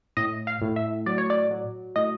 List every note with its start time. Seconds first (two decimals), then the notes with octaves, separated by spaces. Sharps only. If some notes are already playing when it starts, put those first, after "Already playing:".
0.17 A2 D#5
0.47 F5
0.62 A2
0.76 E5
1.06 F#3 D5
1.18 C#5
1.30 D5
1.51 F#3
1.96 A2 D#5